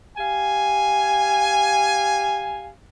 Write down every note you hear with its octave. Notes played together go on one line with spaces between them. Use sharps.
G4 F5 G#5